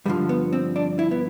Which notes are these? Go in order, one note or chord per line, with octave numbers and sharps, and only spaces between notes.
G2 D3 F3 G3
B3
C4
D4
E4
B3